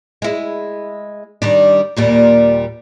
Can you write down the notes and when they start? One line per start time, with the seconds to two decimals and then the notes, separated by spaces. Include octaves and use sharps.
0.22 G#3 E4
1.42 D#3 G3 D4
1.96 D#2 A#2 G3